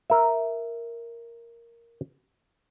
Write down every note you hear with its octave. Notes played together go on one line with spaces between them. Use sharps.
A#4 E5